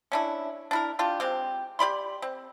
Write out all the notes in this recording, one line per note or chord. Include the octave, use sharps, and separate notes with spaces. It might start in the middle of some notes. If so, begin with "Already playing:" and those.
C#4 D4 E4
D4 E4 A#4
D4 F4 G4
G#3 C4 G4
G4 D5 B5 C6
C4